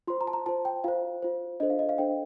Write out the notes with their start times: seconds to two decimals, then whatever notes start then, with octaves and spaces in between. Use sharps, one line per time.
0.07 F4 C5 C6
0.21 A#5
0.27 A5
0.33 A#5
0.46 F4 C5 A5
0.65 G5
0.84 F4 C5 F5
1.22 F4 C5
1.60 D4 A4 C5 D#5
1.70 F5
1.79 D#5
1.89 F5
1.98 D4 A4 C5 G5